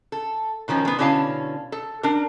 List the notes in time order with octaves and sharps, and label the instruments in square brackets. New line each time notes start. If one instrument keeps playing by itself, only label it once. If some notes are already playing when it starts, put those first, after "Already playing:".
[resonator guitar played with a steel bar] A4
B2 D#3 F3 C#4
G#3 B3
B2 D3 C#4 E4 F5 A5
A4
D4 A#4